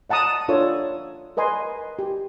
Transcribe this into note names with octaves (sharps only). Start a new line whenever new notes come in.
D#5 F#5 A5 A#5 D#6
D4 F4 A4 C#5 D5
A#4 B4 D#5 G#5 C6
G4